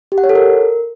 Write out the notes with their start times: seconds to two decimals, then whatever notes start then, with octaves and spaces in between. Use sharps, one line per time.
0.12 G4
0.18 F#5
0.24 C#5
0.29 A4
0.35 A#4